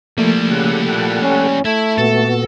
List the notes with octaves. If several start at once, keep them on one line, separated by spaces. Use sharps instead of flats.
F3 G3 A3 A#3 E4
C#3 G4 A4 F#5
A#2
C#4
A3 E4 E5
A#2 B3 F#4 A4